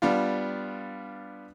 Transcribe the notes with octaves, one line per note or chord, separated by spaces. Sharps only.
G3 B3 D4 F4